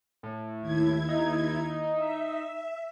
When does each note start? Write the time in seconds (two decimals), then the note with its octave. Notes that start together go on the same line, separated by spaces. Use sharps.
0.23 A2
0.61 D#2 E4 G#6
1.09 D#4
1.95 E5